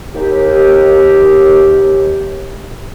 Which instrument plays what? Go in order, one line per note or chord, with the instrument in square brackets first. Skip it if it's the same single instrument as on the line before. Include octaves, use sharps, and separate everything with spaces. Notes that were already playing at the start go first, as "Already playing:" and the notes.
[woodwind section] D#2 G4